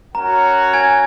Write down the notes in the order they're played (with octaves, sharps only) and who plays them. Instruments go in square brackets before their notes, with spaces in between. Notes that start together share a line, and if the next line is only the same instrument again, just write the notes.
[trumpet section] C#4 F#4 A#4 C#5 F#5 [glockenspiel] A#5
[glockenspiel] G#5 G#6